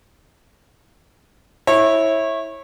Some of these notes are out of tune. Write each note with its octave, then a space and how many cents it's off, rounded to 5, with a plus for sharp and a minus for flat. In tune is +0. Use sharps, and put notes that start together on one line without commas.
E4 -10 C#5 -25